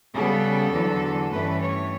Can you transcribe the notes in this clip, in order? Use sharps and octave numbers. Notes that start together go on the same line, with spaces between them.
C#3 G3 B3 A4
E2 D3 F#3
G2 E3 A3 C#4 B4
C#5